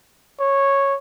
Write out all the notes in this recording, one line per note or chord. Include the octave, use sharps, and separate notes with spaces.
C#5